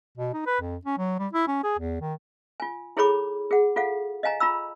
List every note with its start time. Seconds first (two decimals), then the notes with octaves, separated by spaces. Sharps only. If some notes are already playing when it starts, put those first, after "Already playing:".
0.18 B2
0.34 D#4
0.46 B4
0.61 F2
0.85 C#4
0.98 F#3
1.19 G3
1.33 E4
1.48 C#4
1.64 G#4
1.79 E2
2.01 D#3
2.60 F4 G#5
2.97 E4 G#4 A4 C#5 B5 D6
3.51 G#4 F#5
3.76 F4 A4 F5 F#5
4.23 D#5 F5 G#5 A#5
4.40 F4 A#5 B5 E6